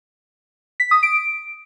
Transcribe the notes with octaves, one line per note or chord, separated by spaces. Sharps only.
B6
D#6
D7